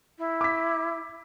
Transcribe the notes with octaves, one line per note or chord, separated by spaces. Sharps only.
E4
D6 B6